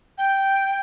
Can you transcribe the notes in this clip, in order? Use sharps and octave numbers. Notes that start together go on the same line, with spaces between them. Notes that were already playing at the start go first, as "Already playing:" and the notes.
G5